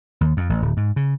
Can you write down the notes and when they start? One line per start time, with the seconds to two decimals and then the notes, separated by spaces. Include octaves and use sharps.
0.21 D#2
0.37 F2
0.49 A1
0.62 D1
0.77 G#2
0.96 C#3